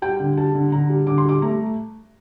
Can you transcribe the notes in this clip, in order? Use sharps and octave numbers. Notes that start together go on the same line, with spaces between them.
G3 G5
D3
G3 A5
D3
D3 A#5
G3
D3 D6
C6
G3 D6
A3 A#5